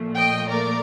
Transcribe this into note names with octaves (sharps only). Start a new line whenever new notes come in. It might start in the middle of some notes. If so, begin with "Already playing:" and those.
Already playing: A#2 F3 A3
D#5 G5
A#4 D5